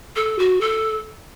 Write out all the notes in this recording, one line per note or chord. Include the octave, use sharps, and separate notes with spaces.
A4
F#4
A4